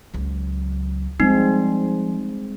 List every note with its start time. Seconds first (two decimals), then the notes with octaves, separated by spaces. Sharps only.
0.14 C#2 F#3
1.20 F3 G3 G#3 C4 D#4